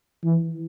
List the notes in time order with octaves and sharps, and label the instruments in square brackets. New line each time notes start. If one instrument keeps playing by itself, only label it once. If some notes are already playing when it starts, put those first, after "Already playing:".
[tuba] E3